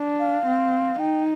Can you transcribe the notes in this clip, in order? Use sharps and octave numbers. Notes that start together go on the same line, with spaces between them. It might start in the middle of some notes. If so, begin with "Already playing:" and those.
Already playing: D4
F5
C4
D#4 G5